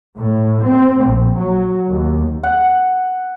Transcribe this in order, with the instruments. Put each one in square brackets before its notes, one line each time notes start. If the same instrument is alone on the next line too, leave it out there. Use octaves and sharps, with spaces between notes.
[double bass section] A2
C4
A#1
F#3
D#2
[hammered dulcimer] F#5